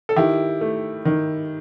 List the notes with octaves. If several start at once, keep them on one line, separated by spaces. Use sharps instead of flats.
A4
D#3 E4 G4
A3
D#3